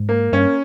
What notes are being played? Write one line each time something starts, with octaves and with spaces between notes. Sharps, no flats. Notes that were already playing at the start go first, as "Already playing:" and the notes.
Already playing: G#2
A#3
G2 C#4